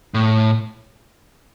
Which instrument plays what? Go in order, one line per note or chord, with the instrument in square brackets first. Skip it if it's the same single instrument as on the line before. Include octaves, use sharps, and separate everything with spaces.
[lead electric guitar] A2